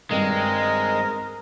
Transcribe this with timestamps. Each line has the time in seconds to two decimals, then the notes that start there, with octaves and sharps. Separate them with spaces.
0.11 G2 D#3 G#3 C4 A#4